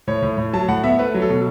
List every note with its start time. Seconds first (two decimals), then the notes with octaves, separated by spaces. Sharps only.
0.07 A2 C#5
0.22 A2
0.38 A2
0.53 F#3 A5
0.68 A2 F#5
0.83 B3 E5
0.99 A3 B4
1.14 F#3
1.22 A4
1.29 B2